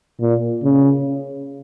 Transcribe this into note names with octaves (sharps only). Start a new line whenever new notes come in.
A#2
C#3